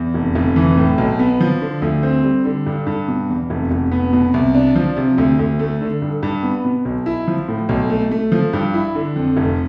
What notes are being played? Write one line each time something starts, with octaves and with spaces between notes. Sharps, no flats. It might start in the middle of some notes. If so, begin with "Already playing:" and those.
Already playing: E2
F1
F1
E3
A2
B1
B3
F3
D3
D2
C4
G3
D3
G2
G2
B2
E2
F1
F1
B3
B2
C2
D4
F3
C3
D2
D2
A3
D3
G2
G2
B3
B2
B1
E4
F3
A2
B1
A3
A3
F3
G2
E4
D3
F2
F1